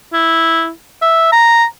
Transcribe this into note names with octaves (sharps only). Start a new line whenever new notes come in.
E4
E5
A#5